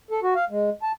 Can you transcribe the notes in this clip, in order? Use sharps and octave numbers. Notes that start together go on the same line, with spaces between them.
A4
F#4
F5
G#3
A5